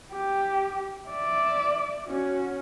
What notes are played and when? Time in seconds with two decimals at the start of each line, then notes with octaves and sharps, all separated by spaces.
0.12 G4
1.08 D5 E5
2.06 C#4 F#4